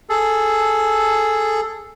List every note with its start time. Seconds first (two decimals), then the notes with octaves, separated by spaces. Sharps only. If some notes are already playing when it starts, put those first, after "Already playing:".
0.09 G#4 A4